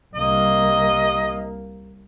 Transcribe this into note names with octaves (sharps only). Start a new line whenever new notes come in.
C2 A#3 D#5